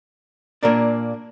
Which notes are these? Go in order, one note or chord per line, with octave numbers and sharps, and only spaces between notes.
A#2 A#3 D4 A#4 D5